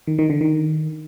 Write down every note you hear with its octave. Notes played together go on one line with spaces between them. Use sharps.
D#3
D#3
D3
D#3